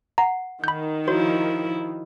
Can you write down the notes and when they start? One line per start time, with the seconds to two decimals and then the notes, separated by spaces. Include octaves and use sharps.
0.18 F#5 A#5
0.64 D#3 B5 G6
1.08 F3 E4 F#4 C#5